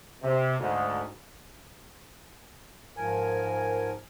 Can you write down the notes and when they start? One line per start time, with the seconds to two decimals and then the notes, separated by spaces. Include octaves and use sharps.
0.23 C3
0.59 D2 G#2
2.97 G#2 F3 A#4 G#5